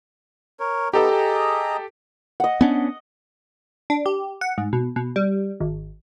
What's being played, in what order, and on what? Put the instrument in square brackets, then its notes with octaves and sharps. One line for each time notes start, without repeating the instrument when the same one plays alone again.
[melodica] A#4 C#5
[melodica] B3 D#4 A#5 [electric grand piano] G4 A4 G5
[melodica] G#4 D#5 A#5
[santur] D#5 F#5
[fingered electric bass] B3 C#4 D4
[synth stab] D4
G4
F#5
G#2
B2
B2
G3
G#1